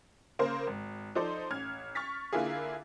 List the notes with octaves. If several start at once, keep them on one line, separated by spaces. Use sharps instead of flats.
C#3 A#3 A#4 C5
G#1
F3 D#4 A4 C5 D5
A1 F6 G#6
C#6 F6 A6 B6
D3 A#3 E4 F4 G#4